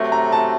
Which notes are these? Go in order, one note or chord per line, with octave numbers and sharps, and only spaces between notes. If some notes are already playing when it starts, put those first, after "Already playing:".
Already playing: C3 F#3 A3
A#5
A5